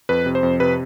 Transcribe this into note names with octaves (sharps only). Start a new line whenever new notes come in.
F2 B4
C3
C5
F2
C3 B4